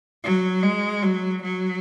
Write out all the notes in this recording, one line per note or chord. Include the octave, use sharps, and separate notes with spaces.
F#3
G#3
F#3
F#3